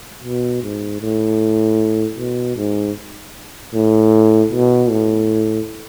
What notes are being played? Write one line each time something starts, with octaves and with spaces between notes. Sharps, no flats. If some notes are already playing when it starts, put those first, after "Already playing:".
B2
G#2
A2
B2
G#2
A2
B2
A2